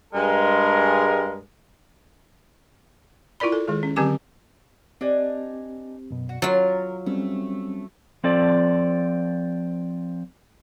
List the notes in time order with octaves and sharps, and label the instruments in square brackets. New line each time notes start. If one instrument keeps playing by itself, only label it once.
[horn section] G2 G#3 A#4
[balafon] E4 F4 A#4 D5 B5
A4
D#3 G#3 G#4
C#4
D3 F#3 C4 G4 G#5 D6
[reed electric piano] C4 G4 [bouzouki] D4 D#4 G#5
[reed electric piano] F#2 B2
[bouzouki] F#4
[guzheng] F#3 F4 [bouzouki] A#4 [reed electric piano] A6
[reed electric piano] G3 C4 C#4 [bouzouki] A3
[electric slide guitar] F3 C4 A4 D5